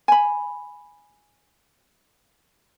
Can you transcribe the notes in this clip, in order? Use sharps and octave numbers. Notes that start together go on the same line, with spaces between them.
G#5 B5